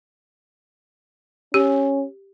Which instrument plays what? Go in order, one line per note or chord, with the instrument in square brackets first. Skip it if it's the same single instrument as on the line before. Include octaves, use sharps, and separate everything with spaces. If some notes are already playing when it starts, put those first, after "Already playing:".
[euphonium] C#4 [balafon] G4